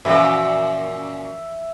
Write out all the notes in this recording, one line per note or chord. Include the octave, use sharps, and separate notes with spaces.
F#2 A#2 E3 F3 B3 E5